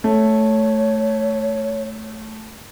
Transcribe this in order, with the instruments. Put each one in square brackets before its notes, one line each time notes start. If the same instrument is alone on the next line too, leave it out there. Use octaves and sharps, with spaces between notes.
[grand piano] A3 [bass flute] C#5